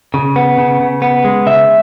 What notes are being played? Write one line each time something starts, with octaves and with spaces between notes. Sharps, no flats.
C#3
B3
C#3
C#3
B3
G#3
C#3 E5